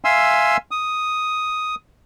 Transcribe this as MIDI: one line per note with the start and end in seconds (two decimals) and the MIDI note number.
0.05 0.57 76
0.05 0.57 77
0.05 0.57 80
0.05 0.57 84
0.05 0.57 88
0.71 1.75 87